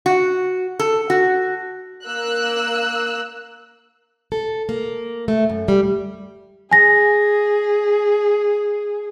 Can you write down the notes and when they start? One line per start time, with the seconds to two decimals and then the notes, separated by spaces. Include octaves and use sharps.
0.06 F#4
0.79 A4
1.10 F#4
2.05 A#3 E6 F#6
4.32 A4
4.69 A#3
5.28 A3
5.50 F#2
5.68 G3
6.71 G#4 G#5 A#6